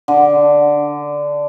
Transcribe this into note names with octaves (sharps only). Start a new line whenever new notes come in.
D3